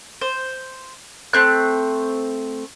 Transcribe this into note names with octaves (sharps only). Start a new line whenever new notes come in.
C5
A3 C4 F#6